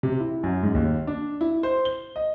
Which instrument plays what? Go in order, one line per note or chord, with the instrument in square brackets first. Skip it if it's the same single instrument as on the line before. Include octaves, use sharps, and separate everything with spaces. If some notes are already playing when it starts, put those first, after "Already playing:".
[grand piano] C3
E4
F#2
G#2
D#2
D4
E4
C5
G7
D#5